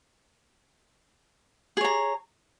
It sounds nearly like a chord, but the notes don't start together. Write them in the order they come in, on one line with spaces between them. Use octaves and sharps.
G#4 C#5 A#5